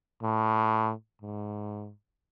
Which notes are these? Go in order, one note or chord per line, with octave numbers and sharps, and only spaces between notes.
A2
G#2